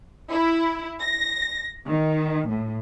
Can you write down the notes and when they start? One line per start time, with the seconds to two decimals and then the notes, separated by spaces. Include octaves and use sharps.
0.30 E4
1.00 A#6
1.87 D#3
2.47 A2